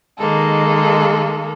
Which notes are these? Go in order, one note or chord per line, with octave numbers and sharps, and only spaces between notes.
D#3 G#3 A#3 A4